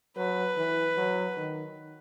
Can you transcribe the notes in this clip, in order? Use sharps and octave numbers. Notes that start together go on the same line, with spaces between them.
F#3 B4
E3
F#3
D#3